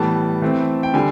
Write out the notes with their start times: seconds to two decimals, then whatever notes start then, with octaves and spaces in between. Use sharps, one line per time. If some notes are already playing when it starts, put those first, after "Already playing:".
Already playing: A2 E3 G3 B3 A5
0.42 E3 A3 C4
0.83 G5
0.94 D3 G3 G#5